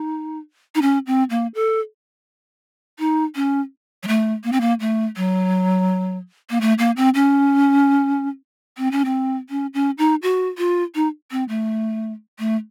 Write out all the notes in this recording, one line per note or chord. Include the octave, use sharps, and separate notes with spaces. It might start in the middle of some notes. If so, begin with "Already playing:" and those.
Already playing: D#4
D#4
C#4
C4
A#3
A4
D#4
C#4
F#3
A3
A#3
C4
A#3
A3
F#3
A#3
A3
A#3
C4
C#4
C4
C#4
C4
C#4
C#4
D#4
F#4
F4
D#4
C4
A3
A3